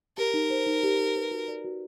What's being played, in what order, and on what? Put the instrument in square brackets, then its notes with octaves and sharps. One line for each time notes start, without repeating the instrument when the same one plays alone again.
[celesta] G4 [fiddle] A#4
[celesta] D#4
C5
D#4
G4
D#4
B4
F#4
D5
F#4